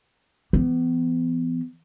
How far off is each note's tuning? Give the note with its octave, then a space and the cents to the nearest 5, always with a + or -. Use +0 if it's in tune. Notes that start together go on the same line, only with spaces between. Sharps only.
E3 +40 B3 +30